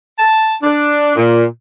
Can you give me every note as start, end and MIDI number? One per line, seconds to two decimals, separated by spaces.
0.19 0.54 81
0.63 1.13 62
1.16 1.44 46